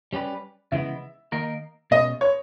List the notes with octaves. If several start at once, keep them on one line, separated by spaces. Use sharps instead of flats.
G3 C#4 G4 B4
C#3 E3 G#3 B3 E5
D#3 A#3 D#4 A#4
B2 G#3 C#4 D#5
C#5